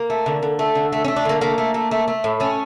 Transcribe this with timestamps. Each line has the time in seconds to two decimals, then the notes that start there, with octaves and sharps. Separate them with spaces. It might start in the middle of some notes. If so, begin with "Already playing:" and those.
Already playing: A#3
0.10 A3
0.26 D3
0.43 D3
0.59 A3
0.75 D3
0.92 A3
1.04 C#4
1.08 A3
1.16 D4
1.25 D3 A#3
1.41 A3 A#3
1.58 A3
1.74 A3
1.91 A3
2.08 A3
2.24 A2
2.40 A3 C#4